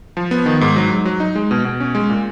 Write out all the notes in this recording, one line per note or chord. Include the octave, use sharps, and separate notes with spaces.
F3
B3
D#3
G#2
F#3
G#2
F#3
D#4
G#3
B2
B2
C#4
G#3
A#2